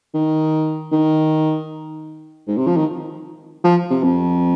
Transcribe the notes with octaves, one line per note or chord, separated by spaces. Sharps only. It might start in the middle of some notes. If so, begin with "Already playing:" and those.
D#3
D#3
G#2
C3
F3
D#3
F3
C3
F2